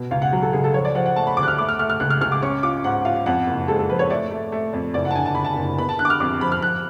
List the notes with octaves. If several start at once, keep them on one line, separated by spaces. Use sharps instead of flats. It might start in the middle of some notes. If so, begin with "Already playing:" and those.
Already playing: B2
C#2 F5
F#5
F#3
A4
C#2 G#4
A4
F3 C#5
D5
F3 F#5
F#5
A3 A5
B5
D2 D6
F#6
F6
A3 D6
F6
A3 F6
F6
C#2 F#6
F6
C#2 F6
D6
C#4 C#6
F4 D6
G#2 F#5
F4 F5
F2 F#5
F#1
G#3 A4
A4
F3 B4
C#5
A3 D5
A3
A3
F2
F#1 D5
F#5
A5
D3 G#5
A5
D3 B5
A5
F#1
B3 B5
A5
D3 F#6
D6
F6
F2 D6
F3 B5
F6
F3 F#6